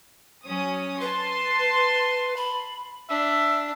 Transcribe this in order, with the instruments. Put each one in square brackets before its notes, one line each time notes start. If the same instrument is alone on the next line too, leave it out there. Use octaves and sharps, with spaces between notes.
[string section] F#3 C#4 D#6
[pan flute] B4 [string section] A5 C6
[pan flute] B5
[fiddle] D4 [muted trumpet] E5